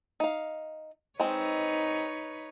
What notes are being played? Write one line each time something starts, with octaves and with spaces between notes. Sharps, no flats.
D#4 F5
G#3 C4 D#4 B4 C#5